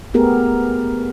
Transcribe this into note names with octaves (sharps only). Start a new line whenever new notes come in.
A3 B3 G4 G#4 A#4